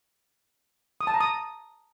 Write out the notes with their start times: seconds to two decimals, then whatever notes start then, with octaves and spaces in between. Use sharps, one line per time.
1.01 D#6
1.07 A5
1.14 A#5
1.21 D#6